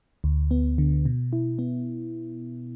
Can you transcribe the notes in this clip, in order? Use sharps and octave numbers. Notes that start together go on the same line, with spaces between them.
D2
B3
D3
B2
E4
B3